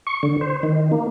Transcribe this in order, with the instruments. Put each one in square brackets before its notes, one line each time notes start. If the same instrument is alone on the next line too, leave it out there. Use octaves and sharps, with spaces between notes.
[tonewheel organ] C#6
D3
C5
D#3
A#3